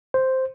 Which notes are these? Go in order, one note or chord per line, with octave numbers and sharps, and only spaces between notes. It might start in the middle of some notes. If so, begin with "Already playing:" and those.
C5